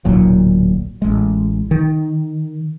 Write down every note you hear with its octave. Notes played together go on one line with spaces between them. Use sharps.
D1 B1 A#2 F#3
A1 G#3
D#3